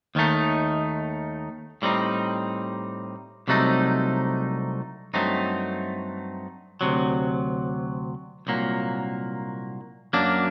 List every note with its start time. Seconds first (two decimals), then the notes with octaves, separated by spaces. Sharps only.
0.15 D#2 D#3 A3 D#4
1.82 A2 G3 C4 D#4
3.48 C2 C3 F#3 A3 D#4
5.14 G2 F#3 A3 C4 D#4
6.81 D2 C3 F#3
8.47 C2 A#2 F#3 A#3
10.13 F#2 F#3 A#3 D4